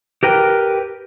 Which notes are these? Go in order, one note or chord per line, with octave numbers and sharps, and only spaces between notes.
G4 A#4 B4 G5